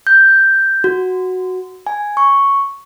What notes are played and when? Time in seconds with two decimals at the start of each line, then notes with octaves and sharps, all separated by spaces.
0.07 G6
0.84 F#4
1.87 G#5
2.17 C#6